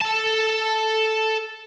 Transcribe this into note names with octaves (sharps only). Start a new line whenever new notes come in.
A4 A5